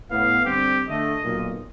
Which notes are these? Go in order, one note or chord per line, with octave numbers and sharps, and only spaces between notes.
A2 B3 F5
D3 G3 C4 G4
D3 A3 D#5
B1 A#2